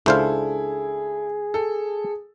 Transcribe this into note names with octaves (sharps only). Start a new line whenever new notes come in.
C#2 D4 E4 G#4 A4 C5 F5
A4